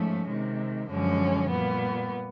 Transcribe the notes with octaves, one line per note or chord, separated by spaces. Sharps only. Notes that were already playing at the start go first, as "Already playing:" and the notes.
Already playing: G#2 F3 A3 C#4
C3 D#3 G#3
F#2 D3 F3 G#3 C#4
A#2 G3 B3